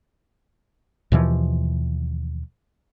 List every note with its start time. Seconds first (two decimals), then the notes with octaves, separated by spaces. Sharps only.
1.12 D#2 B2 E3 F3